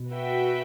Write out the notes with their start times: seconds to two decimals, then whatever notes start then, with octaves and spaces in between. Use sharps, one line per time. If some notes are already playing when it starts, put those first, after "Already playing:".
Already playing: B2
0.12 F#4 B4 E5 G5